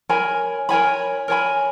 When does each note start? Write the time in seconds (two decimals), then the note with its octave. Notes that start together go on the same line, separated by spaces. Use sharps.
0.09 A#4 C#5 G#5 B5
0.69 A#4 C#5 G#5 B5
1.28 A#4 C#5 G#5 B5